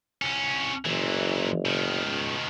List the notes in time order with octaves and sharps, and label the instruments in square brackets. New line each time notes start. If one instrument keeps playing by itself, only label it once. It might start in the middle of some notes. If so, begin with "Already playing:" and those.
[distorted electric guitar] C2 C#4
[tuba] F#1 [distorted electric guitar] A#2 E3
[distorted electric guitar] B2 D#3
[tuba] C#2